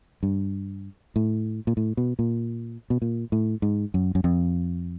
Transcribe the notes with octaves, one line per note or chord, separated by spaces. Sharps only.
G2
A2
A#2
A2
B2
A#2
B2
A#2
A2
G#2
F#2
F#2
F2